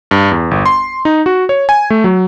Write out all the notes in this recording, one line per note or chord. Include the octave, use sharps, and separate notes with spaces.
G2
E2
G1
C6
D#4
F#4
C#5
G#5
A3
F#3